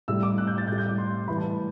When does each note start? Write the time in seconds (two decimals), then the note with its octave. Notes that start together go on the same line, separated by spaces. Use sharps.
0.08 A2 G3 E6
0.23 D6
0.38 F#6
0.47 G6
0.58 A6
0.67 A2 G3 G6
0.78 G6
0.89 D6
0.98 C6
1.28 A2 E3 G3 B5
1.38 A5